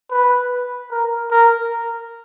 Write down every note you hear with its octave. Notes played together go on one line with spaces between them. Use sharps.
B4
A#4
A#4